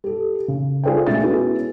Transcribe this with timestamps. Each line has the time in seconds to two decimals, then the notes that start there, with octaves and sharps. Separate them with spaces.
0.04 G4 A4
0.48 C#3
0.83 F4 G#4 C5 D5 G5
1.07 B2 G#3 A3 C#4 E5 A6
1.23 B3 C#4 E4 F#4 G#4